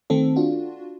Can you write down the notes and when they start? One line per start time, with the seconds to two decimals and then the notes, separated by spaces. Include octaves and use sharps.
0.10 D#3 A3 C4 A4
0.36 D4 F4 F#4